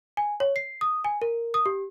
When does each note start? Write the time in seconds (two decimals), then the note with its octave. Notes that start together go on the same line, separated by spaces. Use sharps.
0.17 G#5
0.40 C#5
0.56 C7
0.81 D#6
1.04 G#5
1.22 A#4
1.54 D#6
1.66 G4